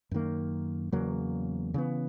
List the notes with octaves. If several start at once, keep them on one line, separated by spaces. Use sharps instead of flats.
F#2 D#3 A#3
E2 C#3 F#3 A#3
C#3 E3 B3